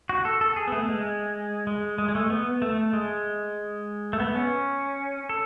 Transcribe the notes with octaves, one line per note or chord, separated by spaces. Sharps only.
F#4
A4
A4
G#4
B3
A3
G#3
G#3
G#3
G#3
A3
B3
A3
G#3
A3
B3
C#4
A4